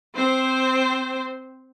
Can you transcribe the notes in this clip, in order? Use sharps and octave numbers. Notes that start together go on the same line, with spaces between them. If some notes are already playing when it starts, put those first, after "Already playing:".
C4 C5